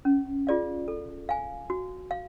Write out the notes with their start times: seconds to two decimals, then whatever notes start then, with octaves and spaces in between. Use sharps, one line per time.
0.05 C#4
0.47 F4 G#4 D5 F5
0.88 A4
1.29 F5 G#5
1.70 F#4
2.11 F5